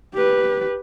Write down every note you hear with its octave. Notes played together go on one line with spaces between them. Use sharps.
G4 B4